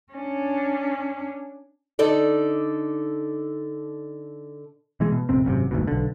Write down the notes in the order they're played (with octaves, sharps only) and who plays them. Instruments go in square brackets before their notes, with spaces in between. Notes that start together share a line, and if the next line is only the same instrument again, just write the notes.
[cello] C#4 D4
[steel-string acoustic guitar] D3 D#4 A4 D5
[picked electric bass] B2 E3 G#3
B2
A#1 F2 C3 C4
G#1 F#2 A2 C3
F#1 D2 G#2 B2
B1 D3